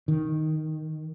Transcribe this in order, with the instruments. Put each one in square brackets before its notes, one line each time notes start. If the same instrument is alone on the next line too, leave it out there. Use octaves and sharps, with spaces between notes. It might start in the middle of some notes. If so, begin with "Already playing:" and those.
[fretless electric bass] D#3